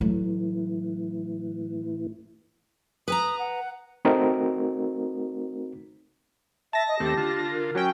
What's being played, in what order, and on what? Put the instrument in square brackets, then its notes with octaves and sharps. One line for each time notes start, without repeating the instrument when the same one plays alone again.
[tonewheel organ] A2 E3 [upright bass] F#3 A3
[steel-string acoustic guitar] B4 G#5 A#5 [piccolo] D#6
[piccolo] F#5
[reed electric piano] A3 C4 D#4 F#4 A#4
[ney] E5 [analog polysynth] A5 A#6
[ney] D#5
[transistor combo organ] D#2 A3 C4 [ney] G4
[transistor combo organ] D3 F4
[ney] A#4
[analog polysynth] F#3 C#4 G5